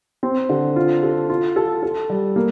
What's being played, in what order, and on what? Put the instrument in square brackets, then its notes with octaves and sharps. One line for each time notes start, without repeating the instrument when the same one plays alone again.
[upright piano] C4
D3
F4
A4
F4
A4
A4
G3
A#3